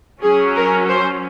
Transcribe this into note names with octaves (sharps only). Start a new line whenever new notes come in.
F#3 C#4 G#4
A#4
C5